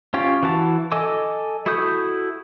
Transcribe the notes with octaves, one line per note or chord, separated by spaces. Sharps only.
C#4 F4 G4 C#5
E3 F#4 A5
A4 D#5 G#5 D6 E6
E4 F#4 A4 D#6 G6